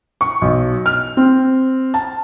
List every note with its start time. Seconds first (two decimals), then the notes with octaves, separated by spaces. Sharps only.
0.21 C#6
0.42 B1
0.86 F6
1.17 C4
1.94 A5